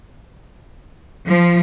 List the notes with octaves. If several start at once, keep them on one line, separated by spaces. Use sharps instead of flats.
F3